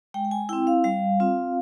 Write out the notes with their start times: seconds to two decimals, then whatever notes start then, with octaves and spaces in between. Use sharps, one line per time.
0.14 G#3 G5
0.25 G5
0.31 G#5
0.49 E4 G5
0.53 C4
0.67 F5
0.84 G3 F5
1.20 C4 F4